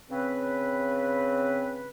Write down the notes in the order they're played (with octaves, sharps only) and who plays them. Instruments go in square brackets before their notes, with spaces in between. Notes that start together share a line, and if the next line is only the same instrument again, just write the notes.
[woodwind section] C#3 C4 B4